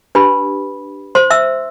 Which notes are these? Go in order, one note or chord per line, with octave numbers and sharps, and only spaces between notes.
D4 G4 B4 B5
C5 C6
E5 E6